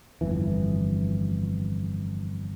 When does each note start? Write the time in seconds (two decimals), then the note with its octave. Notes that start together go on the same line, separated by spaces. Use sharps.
0.21 G1 F2 E3